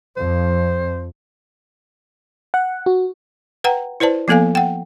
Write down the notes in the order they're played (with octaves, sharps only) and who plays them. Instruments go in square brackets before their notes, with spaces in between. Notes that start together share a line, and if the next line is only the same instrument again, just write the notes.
[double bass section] F2 [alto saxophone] C5
[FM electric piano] F#5
F#4
[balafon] B4 F#5 G5 A#5
E4 B4 C5 D5 A5
F3 A#3 B3 A4 F5 G#5
F#5 G5